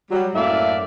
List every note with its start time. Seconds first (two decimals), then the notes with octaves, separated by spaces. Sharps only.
0.12 F#3 G3
0.35 F#2 A2 A#3 D5 E5 F5